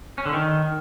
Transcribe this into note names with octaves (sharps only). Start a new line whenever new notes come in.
C#4
D3
D#3